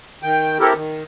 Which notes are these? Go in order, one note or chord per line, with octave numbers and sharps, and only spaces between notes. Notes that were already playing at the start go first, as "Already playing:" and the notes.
D#3 G5
C4 E4 G4 A4 A#4
D#3